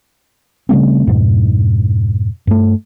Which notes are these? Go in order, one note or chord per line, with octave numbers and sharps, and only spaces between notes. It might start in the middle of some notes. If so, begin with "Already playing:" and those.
C#3 G3 A3 C4
F2 G#2 B2
G2 A3